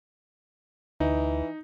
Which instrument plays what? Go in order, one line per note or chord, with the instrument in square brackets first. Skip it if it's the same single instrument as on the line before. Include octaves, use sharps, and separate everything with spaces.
[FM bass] D2 [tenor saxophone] E3 [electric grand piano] D#4